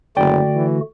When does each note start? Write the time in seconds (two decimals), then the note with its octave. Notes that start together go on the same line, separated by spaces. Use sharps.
0.17 F#1 D3 A3 F#4 D5 G5
0.55 E3